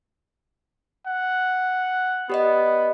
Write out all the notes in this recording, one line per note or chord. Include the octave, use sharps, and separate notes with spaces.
F#5
B3 G4 D5 D#5